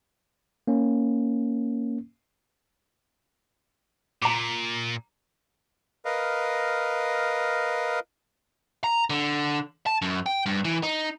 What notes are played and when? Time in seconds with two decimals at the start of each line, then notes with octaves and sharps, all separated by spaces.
0.68 A#3 C#4
4.22 A#2 A#5 D6
6.05 A#4 B4 D#5 F5
8.84 A#5
9.10 D3
9.86 A5
10.02 F#2
10.26 G5
10.46 G2
10.65 E3
10.83 D#4